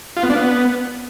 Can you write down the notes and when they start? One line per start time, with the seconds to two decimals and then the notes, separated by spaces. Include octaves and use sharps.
0.17 F4
0.23 B3
0.30 D4
0.36 B3